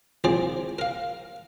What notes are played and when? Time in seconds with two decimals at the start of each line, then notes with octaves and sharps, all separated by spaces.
0.24 C2 F3 G#4 C5 D5
0.79 A#4 F5